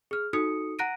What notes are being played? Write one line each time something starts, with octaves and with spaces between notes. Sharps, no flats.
G#4 F6
D#4 F#4 A4 D#6 C#7
F#5 A#5 F#6 A#6 D7 D#7